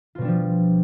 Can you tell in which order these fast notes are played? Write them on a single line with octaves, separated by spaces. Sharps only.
F4 B2 G3 D4 F3